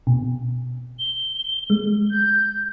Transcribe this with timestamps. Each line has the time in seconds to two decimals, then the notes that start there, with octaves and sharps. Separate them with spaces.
0.07 B2
0.99 G7
1.70 G#3
2.11 G6